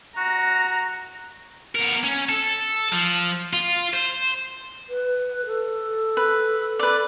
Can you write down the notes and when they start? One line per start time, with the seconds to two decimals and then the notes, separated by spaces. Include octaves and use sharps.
0.17 F#4 A#5
1.75 B3 A#4
2.04 C#4
2.29 A4
2.93 F3
3.53 F4
3.93 C5
4.89 B4
5.46 A4
6.17 B4
6.79 B4 D5